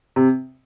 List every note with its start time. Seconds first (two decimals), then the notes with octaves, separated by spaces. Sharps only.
0.16 C3